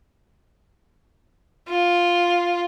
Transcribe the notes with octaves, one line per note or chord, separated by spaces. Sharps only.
F4